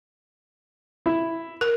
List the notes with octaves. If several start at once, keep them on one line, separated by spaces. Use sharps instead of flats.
E4
A#4